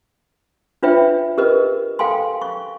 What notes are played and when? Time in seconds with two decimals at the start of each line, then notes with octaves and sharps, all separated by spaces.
0.83 D4 F4 B4 C#5 E5 G5
1.38 G4 A#4 B4 D#5
1.99 A4 F5 G5 G#5 C6
2.42 C#6